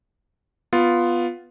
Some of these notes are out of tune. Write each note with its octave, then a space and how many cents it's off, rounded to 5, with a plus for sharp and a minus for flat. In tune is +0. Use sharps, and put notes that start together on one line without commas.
B3 +0 F4 +0